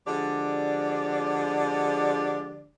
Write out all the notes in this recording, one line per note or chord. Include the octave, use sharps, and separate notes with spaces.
D3 F3 G#3 D4 G4 D5